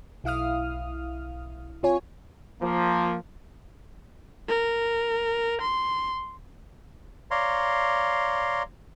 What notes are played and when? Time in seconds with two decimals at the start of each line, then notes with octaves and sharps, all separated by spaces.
0.24 B1 E4 F5 D#6 F6
1.83 C3 F4 C#5 G#5
2.60 F3 A#3
4.48 A#4
5.61 C6
7.31 C#5 D5 F5 A#5 C6